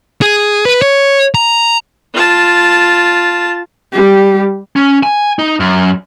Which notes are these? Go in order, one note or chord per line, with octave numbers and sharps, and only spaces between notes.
G#4
B4
C#5
A#5
F4 A5
G3 G4
C#4
G#5
D#4
F#2